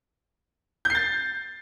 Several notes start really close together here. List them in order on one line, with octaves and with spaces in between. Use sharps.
G6 C7 A6